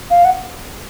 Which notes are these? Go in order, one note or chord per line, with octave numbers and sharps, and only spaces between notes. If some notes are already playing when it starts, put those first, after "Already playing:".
F5
F#5